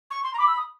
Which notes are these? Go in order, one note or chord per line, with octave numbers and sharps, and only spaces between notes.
C#6
C6
A#5
B5 D6
E6
D#6